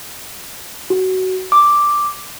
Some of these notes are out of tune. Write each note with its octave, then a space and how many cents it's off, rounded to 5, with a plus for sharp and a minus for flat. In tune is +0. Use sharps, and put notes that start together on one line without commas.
F#4 +15
D6 +0